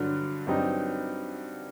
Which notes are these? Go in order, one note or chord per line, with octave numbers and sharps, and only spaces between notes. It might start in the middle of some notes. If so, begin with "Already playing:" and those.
Already playing: G2 D3 F#3
G2 F#3 C4 D#4 G4